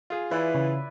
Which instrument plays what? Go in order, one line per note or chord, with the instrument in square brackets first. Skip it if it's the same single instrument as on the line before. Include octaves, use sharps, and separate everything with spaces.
[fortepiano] F4 G#4
[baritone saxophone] E3 [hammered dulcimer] E4 B4 D5
[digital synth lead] C#3